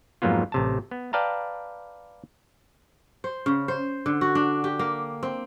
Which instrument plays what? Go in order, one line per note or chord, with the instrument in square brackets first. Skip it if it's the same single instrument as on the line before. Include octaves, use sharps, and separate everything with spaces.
[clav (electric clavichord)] F2 G#2 F#3 A#3 B3 F4
A1 C3 A5
B3
B4 D5 F5 G5 A5 A#5
[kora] C5
C#3
C5
D3
F#4
D4
G4
A#3
C4